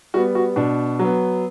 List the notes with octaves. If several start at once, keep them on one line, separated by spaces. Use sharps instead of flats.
G3 B3 F#4
F#4
B2 D4
F#3 B3